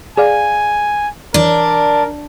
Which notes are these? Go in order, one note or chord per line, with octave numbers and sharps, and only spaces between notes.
G#4 D5 F5 G#5
E3 D4 A#4